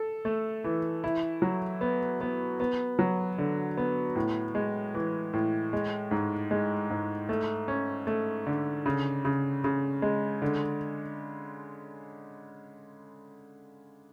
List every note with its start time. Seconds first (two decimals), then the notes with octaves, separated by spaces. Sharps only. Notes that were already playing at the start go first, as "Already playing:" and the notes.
Already playing: A4
0.25 A3
0.64 E3
1.04 E4
1.42 F#3
1.81 B3
2.21 B3
2.60 B3
2.99 F#3
3.38 D3
3.77 B3
4.16 A2
4.55 G#3
4.94 E3
5.33 A2
5.73 G#3
6.11 G#2
6.51 G#3
6.90 G#2
7.29 A3
7.68 C#4
8.07 A3
8.46 D3
8.86 C#3
9.25 C#3
9.64 C#3
10.02 G#3
10.42 D3